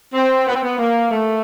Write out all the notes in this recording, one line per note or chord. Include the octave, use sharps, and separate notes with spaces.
C4
B3
C4
B3
A#3
A3